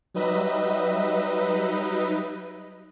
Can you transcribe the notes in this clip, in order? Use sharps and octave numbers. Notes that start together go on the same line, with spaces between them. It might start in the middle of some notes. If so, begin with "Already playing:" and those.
F#3 G3 D#4 B4 D#5 E5